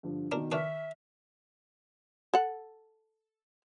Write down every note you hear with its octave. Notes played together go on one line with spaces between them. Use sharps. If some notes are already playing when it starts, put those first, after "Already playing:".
G2 D3 F3
B2 D#3 D4 A#4
D#3 D4 B4 E5 C#6 F6 B6
A4 F#5